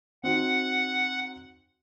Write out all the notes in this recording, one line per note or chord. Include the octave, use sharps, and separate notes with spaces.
C4 D#4 F#4 F#5